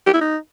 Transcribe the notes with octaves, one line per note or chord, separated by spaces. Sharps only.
G4
E4
D#4